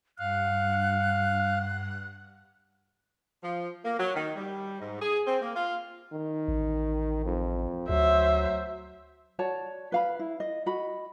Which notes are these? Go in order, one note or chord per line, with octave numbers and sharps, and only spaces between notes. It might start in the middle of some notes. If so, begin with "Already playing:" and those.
G2 F5 F#5 F#6
F3
A#3
F#3
D#3
G3
G#2
G#4
C4
A#3
F4
D#3
A1
F2
D2 F#3 C5 E5
F#4 C#5 D5 A5
B4 F5 B5
E4
D#5
F#4 D#5 B5